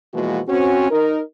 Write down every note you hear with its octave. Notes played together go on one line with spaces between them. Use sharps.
B2 E3 F3 G#3 A#3 F#4
C4 C#4 F#4
D#4 A#4